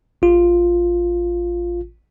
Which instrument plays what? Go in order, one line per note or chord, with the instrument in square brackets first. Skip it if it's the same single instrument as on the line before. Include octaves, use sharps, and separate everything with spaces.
[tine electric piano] A1 F4